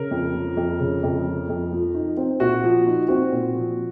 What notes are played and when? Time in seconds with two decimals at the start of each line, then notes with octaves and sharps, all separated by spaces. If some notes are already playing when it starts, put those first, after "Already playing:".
Already playing: C#3 A#4
0.11 F2
0.34 F3
0.57 F2
0.80 C#3
1.03 F2
1.26 F3
1.49 F2
1.72 F3
1.94 D#4
2.17 C4
2.40 A#2 F#4
2.64 F3
2.87 D#4
3.08 C4 F#4
3.32 A#2
3.55 F3